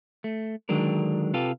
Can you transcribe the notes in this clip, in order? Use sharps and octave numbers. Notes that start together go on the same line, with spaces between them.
A3
D3 D#3 F#3 G#3 D4 A#4
C3 F4 G4 A4 B4 F5